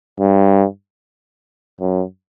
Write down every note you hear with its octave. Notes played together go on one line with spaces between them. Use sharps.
G2
F#2